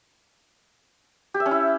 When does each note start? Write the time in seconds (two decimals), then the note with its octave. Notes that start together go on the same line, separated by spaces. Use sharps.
1.34 G4
1.40 E5
1.46 C#4
1.51 E4